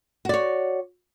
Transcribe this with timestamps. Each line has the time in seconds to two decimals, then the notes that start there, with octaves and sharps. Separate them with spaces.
0.25 F#4
0.29 D5
0.34 C#5